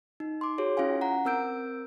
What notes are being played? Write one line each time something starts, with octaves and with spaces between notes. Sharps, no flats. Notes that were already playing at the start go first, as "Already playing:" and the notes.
D#4
C6 D6
F#4 G#4 C#5
C#4 E4 F4 F5 G#5
F#5 A#5
C4 A#4 E6 G6 D7